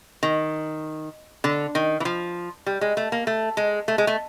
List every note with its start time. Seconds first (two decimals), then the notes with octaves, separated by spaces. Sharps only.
0.23 D#3
1.44 D3
1.75 D#3
2.00 E3
2.05 F3
2.66 G3
2.81 G#3
2.97 A3
3.12 A#3
3.27 A3
3.57 G#3
3.88 A3
3.98 G#3
4.07 A3